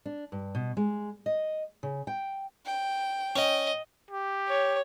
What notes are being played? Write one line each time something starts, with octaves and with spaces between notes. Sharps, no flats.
D4
G2
B2
G#3
D#5
C#3
G5
G5
C#4 D#5
G4
C#5